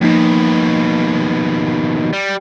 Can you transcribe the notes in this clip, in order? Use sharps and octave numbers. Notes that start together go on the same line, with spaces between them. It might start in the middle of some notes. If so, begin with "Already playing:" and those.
D#2 B2 F3 A#3 D#4
G3